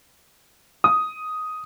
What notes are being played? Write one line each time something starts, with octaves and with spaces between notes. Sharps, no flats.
D#6